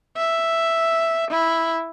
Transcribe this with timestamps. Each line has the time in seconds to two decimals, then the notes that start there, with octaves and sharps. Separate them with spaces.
0.17 E5
1.31 E4